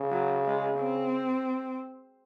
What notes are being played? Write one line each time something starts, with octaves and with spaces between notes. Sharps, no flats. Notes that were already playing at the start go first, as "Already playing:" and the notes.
Already playing: C#3
F#3
G#3
C4